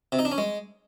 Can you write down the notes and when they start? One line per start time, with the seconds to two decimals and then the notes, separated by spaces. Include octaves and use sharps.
0.12 C3
0.19 D#4
0.25 D4
0.32 C#4
0.38 G#3